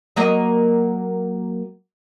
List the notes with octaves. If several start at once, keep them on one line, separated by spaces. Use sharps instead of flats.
F#3 A#3 D#5